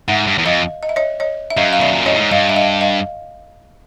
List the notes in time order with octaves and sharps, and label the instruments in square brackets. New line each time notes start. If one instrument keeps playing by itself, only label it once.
[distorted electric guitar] G#2 [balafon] E5 F#5
[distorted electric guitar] G2
E2
[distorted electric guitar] F2 [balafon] D#5 F5
[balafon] D#5
E5
C#5 D#5
C#5 D#5
E5
[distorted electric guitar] F#2 [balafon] D#5 F5
[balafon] F5
[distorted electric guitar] B2 [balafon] D5 E5
[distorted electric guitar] A#2
[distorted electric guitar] A2 [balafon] C#5 D#5
[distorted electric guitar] G#2
[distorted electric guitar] G2 [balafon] D#5 F5
[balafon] E5
D#5 F5
D#5 F5